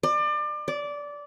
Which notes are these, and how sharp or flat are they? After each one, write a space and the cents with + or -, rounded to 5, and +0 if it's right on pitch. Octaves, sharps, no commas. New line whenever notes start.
D5 +30
D5 -15